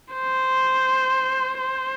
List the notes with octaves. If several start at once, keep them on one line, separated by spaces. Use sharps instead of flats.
C5
C5